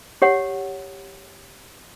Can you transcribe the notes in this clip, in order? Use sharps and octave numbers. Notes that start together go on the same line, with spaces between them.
G4 C#5 F#5